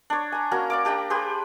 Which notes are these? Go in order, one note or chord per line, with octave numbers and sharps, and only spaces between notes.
D4 C#5
G#5 A#5
A#3 C#4 F#4 A#5
D5 F5 D6
D4 G4 G5 A#5
G4 G#4 B4 C5